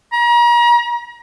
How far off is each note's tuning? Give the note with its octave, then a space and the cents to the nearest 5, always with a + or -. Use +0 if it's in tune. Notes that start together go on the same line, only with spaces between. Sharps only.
A#5 +40